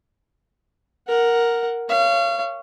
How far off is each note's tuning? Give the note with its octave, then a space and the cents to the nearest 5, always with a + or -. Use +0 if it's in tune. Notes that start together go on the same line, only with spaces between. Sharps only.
A#4 +0 F#5 +0
C#5 +5 F5 -35